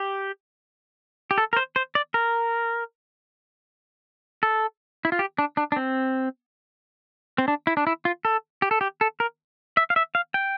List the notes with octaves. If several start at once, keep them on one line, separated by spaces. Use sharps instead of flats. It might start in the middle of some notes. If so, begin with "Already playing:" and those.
Already playing: G4
G4
A4
A#4
C5
C5
D5
A#4
A4
E4
F4
G4
D4
D4
D4
C4
C4
D4
E4
D4
E4
F4
A4
G4
A4
G4
A4
A#4
E5
F5
E5
F5
G5